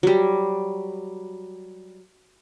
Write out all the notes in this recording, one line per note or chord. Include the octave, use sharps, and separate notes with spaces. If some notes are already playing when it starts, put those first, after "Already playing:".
F#3 G3